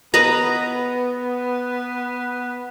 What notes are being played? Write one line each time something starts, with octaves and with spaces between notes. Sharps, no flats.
B3 B4 D#5 A#5